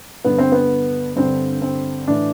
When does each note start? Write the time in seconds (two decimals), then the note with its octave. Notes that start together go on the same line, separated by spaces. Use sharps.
0.24 G2 D3 B3
0.38 C4
0.52 B3
1.16 G2 D3 C4
1.62 C4
2.08 A2 E3 D4